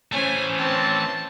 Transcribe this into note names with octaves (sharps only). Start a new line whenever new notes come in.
E3 A3 C#4 C5 G#5
C4 A5